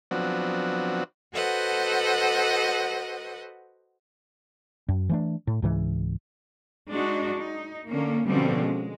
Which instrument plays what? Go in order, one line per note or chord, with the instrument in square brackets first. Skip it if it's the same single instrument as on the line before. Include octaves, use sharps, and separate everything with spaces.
[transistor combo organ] F3 F#3 B3 C4 D4 F#4
[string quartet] F#4 A4 B4 C5 D#5 F#5
[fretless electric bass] F#2
E3 A3 D4
A2
C#2 G#2 E3
[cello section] G#3 D4 D#4 F#4
D#4
D3 A#3 C#4
B2 D3 F3 G3 C4 C#4
G#3